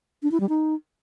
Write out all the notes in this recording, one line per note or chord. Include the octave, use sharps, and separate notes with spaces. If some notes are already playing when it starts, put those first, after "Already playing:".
D4
E4
G3
D#4